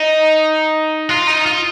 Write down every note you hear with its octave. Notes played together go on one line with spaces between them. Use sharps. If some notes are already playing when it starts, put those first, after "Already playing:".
Already playing: D#4
F4
D#4
F4